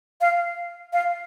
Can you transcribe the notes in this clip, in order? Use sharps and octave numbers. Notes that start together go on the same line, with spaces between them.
F5
F5